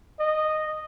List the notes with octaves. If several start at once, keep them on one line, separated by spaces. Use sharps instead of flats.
D#5